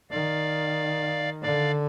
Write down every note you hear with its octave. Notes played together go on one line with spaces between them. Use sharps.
D#3 D5 F5
D3 D5 F5